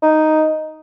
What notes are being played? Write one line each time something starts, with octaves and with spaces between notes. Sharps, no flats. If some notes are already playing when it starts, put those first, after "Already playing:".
D#4